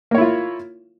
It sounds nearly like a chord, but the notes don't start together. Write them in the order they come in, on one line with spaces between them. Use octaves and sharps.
A#3 C#5 E4 F4